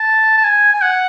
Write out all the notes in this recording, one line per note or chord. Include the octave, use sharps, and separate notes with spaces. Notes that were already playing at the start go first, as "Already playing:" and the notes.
Already playing: A5
A5
G#5
G#5
F#5